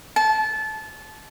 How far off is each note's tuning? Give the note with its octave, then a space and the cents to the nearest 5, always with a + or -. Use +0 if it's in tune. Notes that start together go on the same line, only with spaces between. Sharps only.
A5 -25